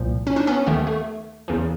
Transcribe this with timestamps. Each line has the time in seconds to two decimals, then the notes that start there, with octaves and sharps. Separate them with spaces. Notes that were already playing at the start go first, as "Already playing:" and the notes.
Already playing: C2 A#2 F3
0.27 C#4
0.36 D4
0.47 B3 C#4
0.66 D#2 D#3 A3 B3
0.87 A3
1.48 E2 C#3 E3